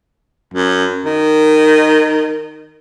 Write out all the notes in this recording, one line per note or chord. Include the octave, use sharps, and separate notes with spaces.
F#2
D#3